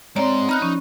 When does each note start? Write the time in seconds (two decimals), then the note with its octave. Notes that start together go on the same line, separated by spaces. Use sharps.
0.16 G#2 C4 C#5 D5 A#5 C6
0.49 D#4 B5 F6 F#6
0.62 F3 C#4